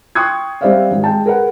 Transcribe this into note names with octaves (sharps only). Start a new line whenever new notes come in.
G5 C6 C#6 D#6 F#6 G#6
G3 C4 C5 D5 E5 F5
G#1
G#3 G5 A5
G#4 A#4 B4 F#5